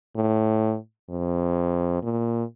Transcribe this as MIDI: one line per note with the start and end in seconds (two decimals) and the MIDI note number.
0.16 0.76 45
1.10 2.02 41
2.03 2.43 46